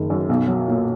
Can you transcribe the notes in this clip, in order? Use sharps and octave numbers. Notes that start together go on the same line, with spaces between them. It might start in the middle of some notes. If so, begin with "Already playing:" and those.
Already playing: F#1 D#3
F#2
B1
F#3
A#2